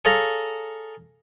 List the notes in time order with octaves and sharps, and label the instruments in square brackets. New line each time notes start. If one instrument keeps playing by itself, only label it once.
[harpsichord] G#4 A4 C#5 F5 A#5